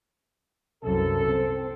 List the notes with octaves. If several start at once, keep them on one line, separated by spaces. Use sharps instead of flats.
C2 F#2 A4
C4